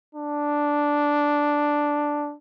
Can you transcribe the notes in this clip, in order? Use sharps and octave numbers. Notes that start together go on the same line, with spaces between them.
D4